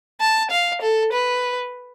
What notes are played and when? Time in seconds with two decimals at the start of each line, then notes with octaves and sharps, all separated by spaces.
0.21 A5
0.51 F5
0.82 A4
1.13 B4